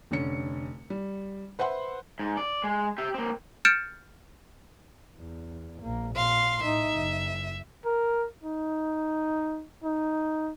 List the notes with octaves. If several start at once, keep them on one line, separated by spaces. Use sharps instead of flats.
F1 D3 C#4 C#7
G3
B4 C5 E5 F#5 C6
G#2
D5
G#3
G4 E5
A#3 C4
F6 G6 A6 C#7 D7 E7
E2
A#1 A#3
A#2 F5 C6
A2 D#4 E5
F#1
A#4
D#4
D#4